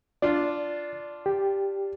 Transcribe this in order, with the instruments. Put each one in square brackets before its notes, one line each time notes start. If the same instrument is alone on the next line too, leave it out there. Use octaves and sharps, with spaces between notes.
[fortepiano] D4 F4 [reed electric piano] D5
[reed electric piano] G4